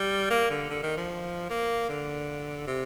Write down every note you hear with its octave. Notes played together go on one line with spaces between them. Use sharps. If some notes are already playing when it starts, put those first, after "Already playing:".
Already playing: G3
A#3
D3
D3
D#3
F3
A#3
D3
C3